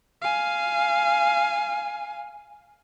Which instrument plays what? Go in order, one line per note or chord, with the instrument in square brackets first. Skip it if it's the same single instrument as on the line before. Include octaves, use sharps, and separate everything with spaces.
[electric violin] F5 G#5